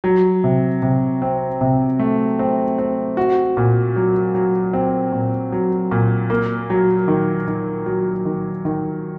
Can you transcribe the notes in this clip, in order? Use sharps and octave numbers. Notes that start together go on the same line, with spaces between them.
F#3
C3
C3
C4
C3
A3
C4
C4
F#4
A#2
F#3
F#3
C4
A#2
F#3
A#2
A#3
F#3
D#3
D#3
F#3
D#3
D#3